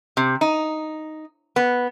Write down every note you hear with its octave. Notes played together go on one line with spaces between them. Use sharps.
C3
D#4
B3